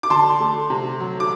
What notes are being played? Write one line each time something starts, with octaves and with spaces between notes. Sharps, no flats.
D6
D3 A5 C6
A3
C3
F#3
D6